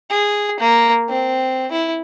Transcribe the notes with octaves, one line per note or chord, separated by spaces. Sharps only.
G#4
A#3
C4
E4